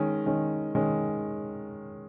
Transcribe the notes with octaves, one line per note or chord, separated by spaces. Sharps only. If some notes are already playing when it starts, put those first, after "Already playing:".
Already playing: D#3 G#3 C#4
D#3 G#3 C#4
D#3 G#3 C#4